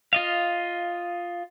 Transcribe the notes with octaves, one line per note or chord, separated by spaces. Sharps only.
F4 D#5 F5